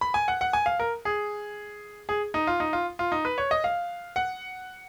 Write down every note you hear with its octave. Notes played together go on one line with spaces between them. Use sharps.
B5
G#5
F#5
F#5
G#5
F5
A#4
G#4
G#4
D#4
F4
D#4
F4
F4
D#4
B4
C#5
D#5
F5
F#5